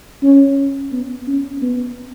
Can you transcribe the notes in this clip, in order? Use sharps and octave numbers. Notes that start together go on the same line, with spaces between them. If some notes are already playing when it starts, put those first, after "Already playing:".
C#4
B3
C#4
B3